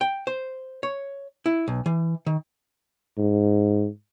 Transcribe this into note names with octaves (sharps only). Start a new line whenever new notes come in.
G5
C5
C#5
E4
B1
E3
D#3
G#2